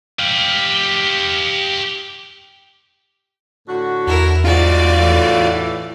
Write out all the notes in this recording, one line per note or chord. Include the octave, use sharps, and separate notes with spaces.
G4 F5
A2 D3 F#4
E2 E4 A#4
G#2 F4 F#4 D5
A2 E3